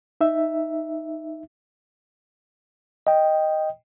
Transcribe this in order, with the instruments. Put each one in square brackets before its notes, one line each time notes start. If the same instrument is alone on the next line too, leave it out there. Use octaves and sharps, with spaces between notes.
[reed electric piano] D#4 E5
[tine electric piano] D#5 G5